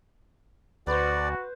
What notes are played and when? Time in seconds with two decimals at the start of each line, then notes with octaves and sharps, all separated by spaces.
0.87 D2 F#4 B4 C5 D5